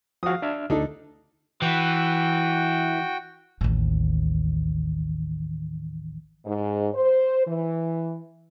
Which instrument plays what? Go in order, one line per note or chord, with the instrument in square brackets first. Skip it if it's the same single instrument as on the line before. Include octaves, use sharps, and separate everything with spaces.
[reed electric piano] F3 F#4 [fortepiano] F5 D#6
[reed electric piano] D4 E5 F6
[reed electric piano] D2 [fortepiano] D4 D#4 A4
[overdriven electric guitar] E3 [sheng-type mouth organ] F#4 G5
[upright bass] A1 D#2
[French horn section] G#2
C5
E3